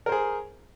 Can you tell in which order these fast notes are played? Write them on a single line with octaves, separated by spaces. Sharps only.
A#4 C5 G#4